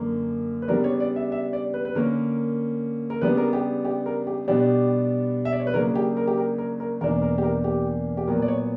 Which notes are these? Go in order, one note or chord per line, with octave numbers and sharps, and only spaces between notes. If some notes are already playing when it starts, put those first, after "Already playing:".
Already playing: F#2 D3 A#3
B4
C#3 G3 B3 D4 A#4
C#5
D5
E5
E5
D5
B4
B4
D3 A#3 C#4 A#4
A#4
C#3 G3 B3 D4 B4
A#4
G4
G4
A#4
G4
B2 G3 B3 D4 G4
E5
D5
C#5
B4
C#3 F#3 A#3 D4 A#4
G4
A#4
G4
A#4
A#4
A#4
E2 B2 A#3 D4 A#4
A#4
G4
A#4
G4
G4
A#2 F#3 B3 A#4
D5
C#5